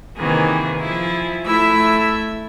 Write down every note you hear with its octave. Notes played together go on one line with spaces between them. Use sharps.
C3 D#3 E3 A#3 G#4
F3 E4 G#4
A3 E4 E5 E6